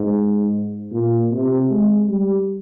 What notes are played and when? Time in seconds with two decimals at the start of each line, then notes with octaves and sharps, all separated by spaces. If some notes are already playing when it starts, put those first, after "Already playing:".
Already playing: G#2
0.92 A#2
1.32 C3
1.70 G#3
2.09 G3